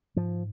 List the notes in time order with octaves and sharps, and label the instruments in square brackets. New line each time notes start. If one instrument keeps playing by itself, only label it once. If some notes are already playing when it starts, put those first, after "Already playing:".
[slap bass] G#2 F3